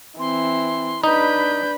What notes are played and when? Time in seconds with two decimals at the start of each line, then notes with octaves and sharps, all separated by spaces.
0.19 E3 C4 C6
1.04 D4 D#4 B4 B5 G6